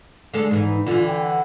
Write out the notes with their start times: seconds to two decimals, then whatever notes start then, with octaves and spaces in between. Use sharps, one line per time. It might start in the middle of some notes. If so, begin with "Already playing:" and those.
0.34 D3 G#3 A4
0.51 G#2 E3 D#4
0.86 D3 E3 F4
1.07 G5
1.23 F#5